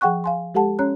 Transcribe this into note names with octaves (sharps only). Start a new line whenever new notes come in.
F3 G#4 F#5 G5 C#6 F#6
F5 G#5 C6
G#3 G4 A4 F#5 A5
C#4 C#5 A#5 F#6